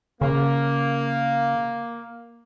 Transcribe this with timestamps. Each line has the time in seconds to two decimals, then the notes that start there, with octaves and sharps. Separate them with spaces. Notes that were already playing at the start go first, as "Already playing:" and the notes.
0.21 C#3 A#3